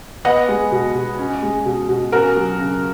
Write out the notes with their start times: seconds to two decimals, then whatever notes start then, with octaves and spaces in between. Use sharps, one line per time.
0.25 B3 D#5 F#5
0.48 G#3
0.71 B2
0.95 B2
1.18 C#4
1.42 G#3
1.65 B2
1.89 B2
2.12 C#4 F#4 A#4
2.36 F#3
2.59 C#3